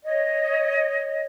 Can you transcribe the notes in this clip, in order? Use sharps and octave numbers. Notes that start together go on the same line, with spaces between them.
C#5 D#5